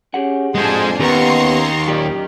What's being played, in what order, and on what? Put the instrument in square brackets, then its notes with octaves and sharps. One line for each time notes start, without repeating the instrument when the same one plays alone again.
[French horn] C#4 [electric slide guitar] G4 G#4 F#5
[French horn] F2 [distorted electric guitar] G#3 C5 [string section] D4 G#5 C6
[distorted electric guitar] D#2 [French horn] B3 [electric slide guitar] C#4 G4 A#4 [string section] A#5 C6 C#6
[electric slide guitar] F#2 G4 D5 [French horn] A#2 [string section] D#3